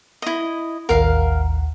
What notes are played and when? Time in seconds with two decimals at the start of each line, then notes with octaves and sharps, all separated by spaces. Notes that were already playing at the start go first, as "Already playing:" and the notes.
0.22 E4 D#5
0.89 A1 D#2 A#4 F5 F#5